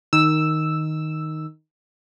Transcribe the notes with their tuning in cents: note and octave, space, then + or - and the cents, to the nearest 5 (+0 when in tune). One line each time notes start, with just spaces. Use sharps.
D#3 +0 E6 +0